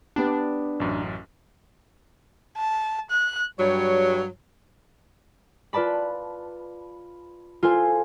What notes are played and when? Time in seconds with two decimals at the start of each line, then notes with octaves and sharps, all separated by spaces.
0.16 B3 D4 G4
0.80 A1 F#2
2.57 A5
3.11 F#6
3.59 G2 F#3 G3 C#5
5.73 F4 B4 D5 A5 B5
7.63 F4 A4 C5 G#5